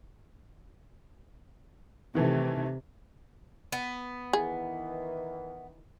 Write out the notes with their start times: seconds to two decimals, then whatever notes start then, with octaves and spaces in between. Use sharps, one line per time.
2.15 C3 D#3 E3 A3
3.72 B3
4.33 D#3 E3 G#4